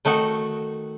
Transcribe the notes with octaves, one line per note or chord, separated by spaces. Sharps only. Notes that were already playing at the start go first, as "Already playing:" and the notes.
D#3 A3 D#4 F#4